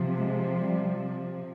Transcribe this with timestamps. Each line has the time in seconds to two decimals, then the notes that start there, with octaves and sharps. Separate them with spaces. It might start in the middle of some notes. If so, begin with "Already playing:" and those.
Already playing: C3 F3
0.19 G#3
0.59 G3